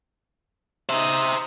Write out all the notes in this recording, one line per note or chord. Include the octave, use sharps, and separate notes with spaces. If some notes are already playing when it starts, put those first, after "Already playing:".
D#4 C5 E5 D#6